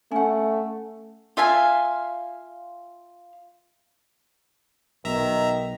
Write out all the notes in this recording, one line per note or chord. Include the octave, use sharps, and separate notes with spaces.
A3 C#4 F#5
F4 E5 F5 G#5
B1 B2 D#3 E5 A#5